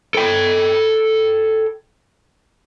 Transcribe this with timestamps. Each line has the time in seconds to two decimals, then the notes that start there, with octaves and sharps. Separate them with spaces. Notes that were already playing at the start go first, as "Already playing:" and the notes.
0.15 A4 G5